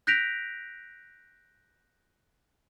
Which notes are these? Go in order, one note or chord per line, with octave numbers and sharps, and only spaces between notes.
F#6 G6 A#6 B6 D7 F7